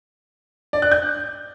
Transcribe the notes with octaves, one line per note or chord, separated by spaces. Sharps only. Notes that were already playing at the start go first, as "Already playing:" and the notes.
D5
F#6
G6